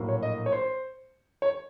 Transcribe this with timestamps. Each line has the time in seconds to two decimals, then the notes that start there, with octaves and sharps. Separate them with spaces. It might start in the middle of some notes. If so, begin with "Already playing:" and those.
Already playing: A#1 A2 F#3 A#3
0.08 C#5
0.23 D#5
0.46 C#5
0.52 C5
1.42 C#5